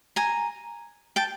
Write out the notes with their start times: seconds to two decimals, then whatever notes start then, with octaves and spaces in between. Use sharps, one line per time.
0.16 G#5 A#5
1.16 G5 A5